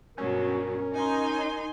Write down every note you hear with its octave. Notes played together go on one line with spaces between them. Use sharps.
G2 B2 F#3 C#4 A#4
D#4 G#5 C6